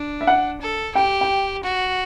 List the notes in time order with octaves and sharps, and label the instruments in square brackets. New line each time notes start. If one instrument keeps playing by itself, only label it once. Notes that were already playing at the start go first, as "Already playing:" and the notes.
Already playing: [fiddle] D4
[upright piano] E5
F#5
[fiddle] A4
[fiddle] G4 [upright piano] G5
[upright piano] G5
[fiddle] F#4